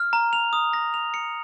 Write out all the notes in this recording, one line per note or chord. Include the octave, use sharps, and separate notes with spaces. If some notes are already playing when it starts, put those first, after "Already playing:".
Already playing: F6
A#5
F7
D#6
A#6
F7
C#7